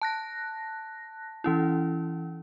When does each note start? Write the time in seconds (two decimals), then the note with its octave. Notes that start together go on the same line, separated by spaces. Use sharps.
0.02 A5 F#6 A#6
1.44 E3 C#4 E4